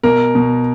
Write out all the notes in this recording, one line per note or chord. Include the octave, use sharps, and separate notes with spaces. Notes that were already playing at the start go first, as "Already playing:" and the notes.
B2 A#4
B2